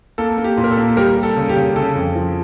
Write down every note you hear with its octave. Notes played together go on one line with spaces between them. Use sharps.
A#3 A4
A#3
G4
A#2
A#4
A4
A#3
G3 G4 A#4
G3
A4
C#3
G4
C#3
C#3 A4
F2
F3